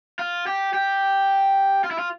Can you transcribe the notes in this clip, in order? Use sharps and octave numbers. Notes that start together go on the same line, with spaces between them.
F4
G4
G4
F4
E4
F4